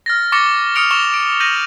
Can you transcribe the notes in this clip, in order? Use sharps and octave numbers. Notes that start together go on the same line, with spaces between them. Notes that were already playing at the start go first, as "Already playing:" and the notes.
F6 A6 A#6
C#6 D6 A6 A#6 C#7 G7
D#6 F6 C#7 D7 F7
C#6 E7 F7 G7
D7
G6 A#6 D#7 F#7